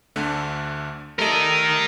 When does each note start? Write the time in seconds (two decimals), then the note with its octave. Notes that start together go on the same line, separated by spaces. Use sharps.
0.16 D2 D3 A3
1.19 G3 A3 A4 A#4 D#5